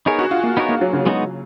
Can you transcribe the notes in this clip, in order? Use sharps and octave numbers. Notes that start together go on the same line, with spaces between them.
B3 D#4 G#4 A#4 C#5
F#4
F4
A#3
B3 D#4 A#4 C#5
A#3
F#3
C#3
F#3 G#3 B3 D#4 F#4